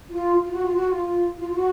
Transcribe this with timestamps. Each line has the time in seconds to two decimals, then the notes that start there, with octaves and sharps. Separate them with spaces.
0.10 F4
0.42 F4
0.53 F#4
0.64 F4
0.75 F#4
0.91 F4
1.39 F4
1.50 F4
1.55 F#4